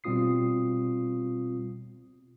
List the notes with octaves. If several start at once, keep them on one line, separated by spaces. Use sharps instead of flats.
B2 G3 C4 F4 D#6 C7